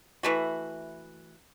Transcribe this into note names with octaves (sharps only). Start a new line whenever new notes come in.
E3 A3 F#4